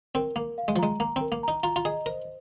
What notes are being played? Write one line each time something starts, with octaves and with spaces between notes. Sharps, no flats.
C4 A#4
A#3 A#4
F5
G#3
F3
G#3 A#5
A#3 A#5
C4 A#4
A#3
D#4 A#5
F4 A#5
F4
G#4 D#5
A#4 C5